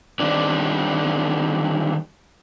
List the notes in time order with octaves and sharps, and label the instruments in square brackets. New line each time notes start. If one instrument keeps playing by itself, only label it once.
[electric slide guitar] D3 D#3 G3 C4 D4